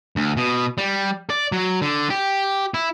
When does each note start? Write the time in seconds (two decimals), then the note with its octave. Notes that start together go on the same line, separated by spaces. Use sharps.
0.16 D2
0.37 B2
0.78 G3
1.30 D5
1.52 F#3
1.82 D3
2.10 G4
2.74 E4